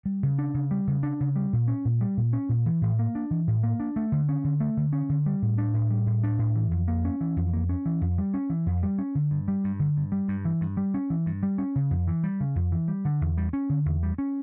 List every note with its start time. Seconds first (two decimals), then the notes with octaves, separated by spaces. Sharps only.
0.05 G3
0.23 C#3
0.38 D4
0.54 C#3
0.71 G3
0.87 C#3
1.03 D4
1.20 C#3
1.36 G3
1.53 A#2
1.68 C#4
1.85 A#2
2.01 G3
2.17 A#2
2.33 C#4
2.49 A#2
2.66 E3
2.82 A2
2.99 A#3
3.15 D4
3.31 E3
3.47 A2
3.63 A#3
3.80 D4
3.96 A3
4.12 D3
4.29 C#4
4.44 D3
4.60 A3
4.77 D3
4.93 C#4
5.09 D3
5.26 G3
5.42 A2
5.58 D4
5.74 A2
5.91 G3
6.06 A2
6.24 D4
6.39 A2
6.56 E3
6.71 F2
6.88 A#3
7.05 C#4
7.21 E3
7.36 F2
7.53 A#3
7.69 C#4
7.86 E3
8.01 F2
8.18 G3
8.34 C#4
8.50 E3
8.66 F2
8.83 G3
8.98 C#4
9.15 D3
9.31 G2
9.48 G3
9.64 G2
9.80 D3
9.97 G2
10.12 G3
10.28 G2
10.45 E3
10.61 G2
10.77 G3
10.94 C#4
11.10 E3
11.26 G2
11.43 G3
11.58 C#4
11.75 C#3
11.91 F2
12.08 E3
12.23 G3
12.40 C#3
12.56 F2
12.72 E3
12.88 G3
13.05 D3
13.21 E2
13.38 G3
13.53 C#4
13.69 D3
13.86 E2
14.03 G3
14.18 C#4